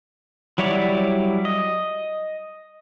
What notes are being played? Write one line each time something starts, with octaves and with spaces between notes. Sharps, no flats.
F#3 G3 E4 C#5 D5
D#5